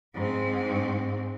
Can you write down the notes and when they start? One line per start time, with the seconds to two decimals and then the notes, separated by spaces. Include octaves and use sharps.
0.14 G#2 C4